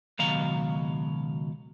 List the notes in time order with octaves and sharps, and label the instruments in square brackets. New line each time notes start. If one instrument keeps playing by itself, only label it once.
[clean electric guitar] C#2 B2 D#3 F#3 F5 A#5